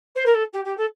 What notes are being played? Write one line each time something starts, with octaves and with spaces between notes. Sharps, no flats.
C5
A#4
A4
G4
G4
A4